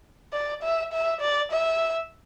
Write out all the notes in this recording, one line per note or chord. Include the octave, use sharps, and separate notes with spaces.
D5
E5
E5
D5
E5